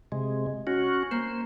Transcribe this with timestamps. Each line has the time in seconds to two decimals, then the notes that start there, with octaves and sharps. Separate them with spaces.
0.12 C3 G#3
0.67 C#4 F#4
1.11 A#3 C5